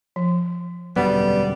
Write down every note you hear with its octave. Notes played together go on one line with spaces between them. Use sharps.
F3
E1 F#2 D3 G3 B3